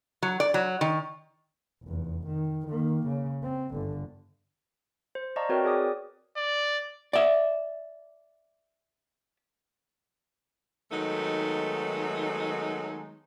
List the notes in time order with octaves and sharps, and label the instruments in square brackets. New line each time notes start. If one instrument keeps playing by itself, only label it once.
[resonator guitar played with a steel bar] F#3
D5
F#3
D#3
[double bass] F1 E2
D#3
D#3 A#3
C#3
C4
G1 D3
[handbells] C5
D5 D#5 F5 A5 A#5 C#6
C4 F#4 A#4 B4 C#5 G5
G#4 D5 G#5 D6 D#6
[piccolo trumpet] D5
[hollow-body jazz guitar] D5 E5
[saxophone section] D#3 F#3 G#3 A3 B3 D#4